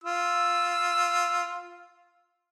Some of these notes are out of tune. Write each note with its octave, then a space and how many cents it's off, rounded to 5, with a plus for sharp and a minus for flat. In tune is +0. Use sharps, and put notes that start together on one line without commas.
F4 +0 E6 +0